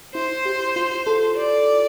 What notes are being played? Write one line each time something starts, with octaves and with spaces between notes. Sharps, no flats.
E4 C5
G4
F4
A4
D5